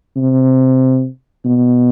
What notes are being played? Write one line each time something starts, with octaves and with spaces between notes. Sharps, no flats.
C3
B2